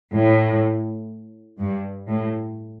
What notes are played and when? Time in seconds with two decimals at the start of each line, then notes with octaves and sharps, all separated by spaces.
0.13 A2
1.59 G2
2.08 A2